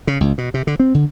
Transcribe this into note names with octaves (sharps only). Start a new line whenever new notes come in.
C#3
C#2
B2
C3
D3
C4
D3